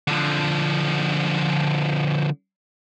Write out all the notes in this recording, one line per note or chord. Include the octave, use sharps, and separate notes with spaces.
D3 F3